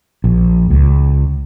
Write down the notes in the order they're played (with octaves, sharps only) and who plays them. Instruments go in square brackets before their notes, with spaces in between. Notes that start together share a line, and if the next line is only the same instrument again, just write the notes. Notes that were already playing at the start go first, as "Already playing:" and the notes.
[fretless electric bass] A#1
C#2